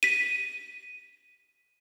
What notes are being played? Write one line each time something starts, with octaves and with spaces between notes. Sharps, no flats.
B6 D#7